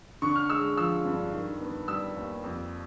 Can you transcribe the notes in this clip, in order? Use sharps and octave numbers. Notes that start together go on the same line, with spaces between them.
D3 C#6
F6
G#3 E6
F3 E6
G2
D#3
B3
G3 E6
D#2
F2